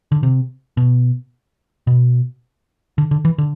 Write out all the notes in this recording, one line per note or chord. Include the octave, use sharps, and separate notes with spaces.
D3
C3
B2
B2
D3
D3
E3
D3